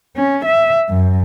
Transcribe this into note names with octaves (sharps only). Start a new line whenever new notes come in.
C#4
E5
F#2